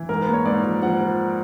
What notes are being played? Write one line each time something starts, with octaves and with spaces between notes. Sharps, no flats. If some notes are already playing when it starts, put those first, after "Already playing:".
Already playing: E3
G#2 A#4
B4
A#3
C#5
G#2 D5
F3
F3 F#5
F3